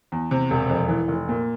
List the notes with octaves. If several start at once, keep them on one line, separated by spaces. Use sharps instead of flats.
E2
C3
E1
F2
E3
F1
A#2